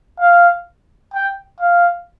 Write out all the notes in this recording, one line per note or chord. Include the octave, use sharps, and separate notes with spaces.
F5
G5
F5